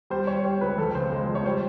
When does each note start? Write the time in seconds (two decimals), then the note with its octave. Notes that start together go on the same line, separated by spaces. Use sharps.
0.10 G3 C5
0.27 G3 C#5
0.44 G3 C5
0.61 C#2 B4
0.78 F2 A4
0.95 C#3 C5
1.11 G#3
1.28 F3
1.35 C#5
1.45 G3 C5